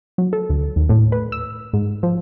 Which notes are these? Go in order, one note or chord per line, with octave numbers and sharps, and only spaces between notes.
F#3
A4
D2
D#2
A2
B4
E6
G#2
F3